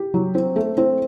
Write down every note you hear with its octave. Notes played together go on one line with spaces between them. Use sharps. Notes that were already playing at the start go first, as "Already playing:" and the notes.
Already playing: G4
F#3
C4
A3
C4